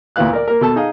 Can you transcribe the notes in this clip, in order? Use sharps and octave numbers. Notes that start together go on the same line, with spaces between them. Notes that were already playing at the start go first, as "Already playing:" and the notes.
D2 A#2 E3 B3 F5 F#6
A#4 D5
A#3 A#4
B2 A4 A5
D#4 G#4 D#5 F5